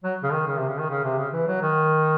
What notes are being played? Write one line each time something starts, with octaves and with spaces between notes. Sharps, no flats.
F#3
C#3
D#3
C#3
C3
C#3
D#3
C#3
C3
C#3
E3
F#3
D#3